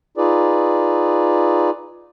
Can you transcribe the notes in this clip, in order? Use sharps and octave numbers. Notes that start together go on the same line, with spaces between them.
D#4 F4 G#4 B4 D5